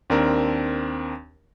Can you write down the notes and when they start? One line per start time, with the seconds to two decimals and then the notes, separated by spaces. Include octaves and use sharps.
0.10 D#2 C4 D4 A#4